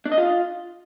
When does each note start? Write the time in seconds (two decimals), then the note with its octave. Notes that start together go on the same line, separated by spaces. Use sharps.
0.06 D4
0.12 D#5
0.18 F4